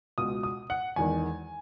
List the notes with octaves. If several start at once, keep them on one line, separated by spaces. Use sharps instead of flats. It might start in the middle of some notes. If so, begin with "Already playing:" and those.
C#2 B2 D#6
D#6
F#5
E1 E2 D#3 G#5